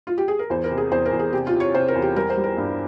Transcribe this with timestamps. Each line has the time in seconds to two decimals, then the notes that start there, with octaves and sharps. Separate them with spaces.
0.07 F4
0.18 G4
0.28 G#4
0.39 A#4
0.50 E2 C5
0.64 A#4
0.71 C3
0.78 G#4
0.91 E2 C5
1.05 A#4
1.12 E2
1.19 G#4
1.33 C3 G4
1.47 F4
1.54 C3
1.60 C#5
1.74 C3 C5
1.88 A#4
1.95 E2
2.02 G4
2.16 G3 A#4
2.30 C5
2.37 G3
2.44 A#4
2.57 G2